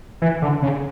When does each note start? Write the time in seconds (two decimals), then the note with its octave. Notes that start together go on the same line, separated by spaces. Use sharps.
0.22 E3
0.42 D3
0.62 C#3